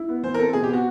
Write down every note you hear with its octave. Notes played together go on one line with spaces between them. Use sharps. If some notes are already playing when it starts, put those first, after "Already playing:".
Already playing: E4
B3
E3 C5
A#4
C4 A4
B2 G#4
G4
B3 F#4